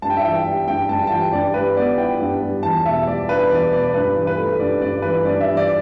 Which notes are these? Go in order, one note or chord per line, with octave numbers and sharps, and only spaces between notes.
G2 A5
G5
E5
E3 G5
G3
G2 G5
G2 A5
A5
E3 G5
G2 D5
G3 B4
B3 D5
E4 G5
G2
G3
E2 A5
B2 E5
G3 D5
D4 B4
E2 D5
B2 D5
G2 B4
E3
B4
A3
G2 D5
G2 D5
E3 B4
G2 D5
E5
E3
D5